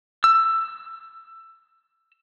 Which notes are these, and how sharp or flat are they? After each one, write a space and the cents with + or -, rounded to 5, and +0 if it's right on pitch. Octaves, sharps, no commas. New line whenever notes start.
E6 +15